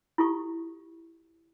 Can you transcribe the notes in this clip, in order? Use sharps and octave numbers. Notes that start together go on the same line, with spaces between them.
E4 F4 G4 A4 C#6